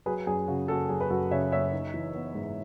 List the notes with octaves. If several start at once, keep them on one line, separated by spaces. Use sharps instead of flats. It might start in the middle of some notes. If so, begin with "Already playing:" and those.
F#3 G#4 B4
F#2 G#4
C#3 F#4
F#1 F#4 A4
F#3 G#4
B4
F#2 F#4 A4
C#3 C#5 E5
F#1 C#5 E5
D#4
E3
B3
G#2